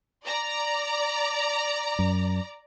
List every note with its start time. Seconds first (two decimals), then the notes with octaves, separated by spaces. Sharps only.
0.24 D5 A#5
1.99 F#2